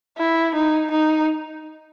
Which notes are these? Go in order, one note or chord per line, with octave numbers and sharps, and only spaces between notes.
E4
D#4
D#4